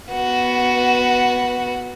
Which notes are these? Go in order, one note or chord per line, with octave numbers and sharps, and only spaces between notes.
B3 F#4